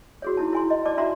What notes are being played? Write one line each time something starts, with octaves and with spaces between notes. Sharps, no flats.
F#4 G#4 C#5
D#4 E4 A5
E4 G#5 C6
D#5
D5 A5 D6
D4 F#4 E5 A#5 C6